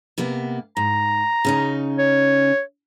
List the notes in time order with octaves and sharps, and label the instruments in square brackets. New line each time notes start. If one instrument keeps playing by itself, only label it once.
[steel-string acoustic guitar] C3 A#3 B3
[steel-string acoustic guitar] G#2 [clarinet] A#5
[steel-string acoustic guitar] C#3 C#4 D#4
[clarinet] C#5